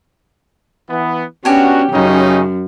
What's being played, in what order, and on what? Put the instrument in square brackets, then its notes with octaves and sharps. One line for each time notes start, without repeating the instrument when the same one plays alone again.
[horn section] E3 B3
[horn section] B3 D4 F#4 [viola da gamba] C#4 [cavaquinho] G4 G#5
[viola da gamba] F#2 [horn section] C#3 C#4 D#4